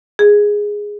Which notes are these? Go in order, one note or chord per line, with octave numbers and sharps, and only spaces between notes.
G#4